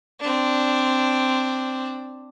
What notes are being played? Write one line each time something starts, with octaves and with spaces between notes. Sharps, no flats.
C4 D4